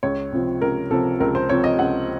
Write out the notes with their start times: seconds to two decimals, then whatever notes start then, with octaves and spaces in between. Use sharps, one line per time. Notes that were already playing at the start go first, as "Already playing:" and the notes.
0.03 C#2 C#5
0.32 C3 F3 C4
0.61 C#2 A#4
0.91 C3 F3 C4 A4
1.20 C#2 A#4
1.35 C5
1.49 C3 F3 C4 C#5
1.64 D#5
1.79 C#2 F#5